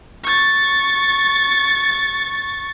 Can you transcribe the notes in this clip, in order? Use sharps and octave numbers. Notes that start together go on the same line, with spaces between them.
C#6 A6